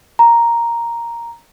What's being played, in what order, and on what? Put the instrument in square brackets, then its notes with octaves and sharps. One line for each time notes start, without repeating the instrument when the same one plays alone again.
[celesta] A#5